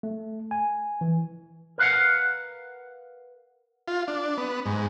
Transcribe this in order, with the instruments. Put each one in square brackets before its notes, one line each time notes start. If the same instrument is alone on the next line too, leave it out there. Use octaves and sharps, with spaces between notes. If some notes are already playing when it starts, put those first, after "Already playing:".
[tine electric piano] A3
G#5
E3
[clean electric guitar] A#4 B4 F5 F#5
[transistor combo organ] F4
D4
B3
G#2